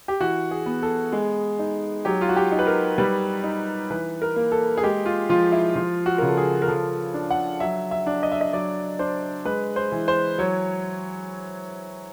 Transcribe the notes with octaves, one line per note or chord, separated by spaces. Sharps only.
G4
E3 F#4
G#4
B3
A4
G#3 G#4
D#4
F#3 G4
F4
F#4
G4
D#4
B4
A#4
G3 B4
D#4
E3 B4
A#4
A#3
A4
G#4
G#3 G4
F4
F3 F4
E4
F3 F4
F#4
C#3 A#4
A4
G#4
A#4
F3 A4
D4
F#5
F#3 E5
E5
D4
D#5
E5
D#5
F#3 D5
D4 C5
G#3 B4
C5
E3
C5
F#3 C#5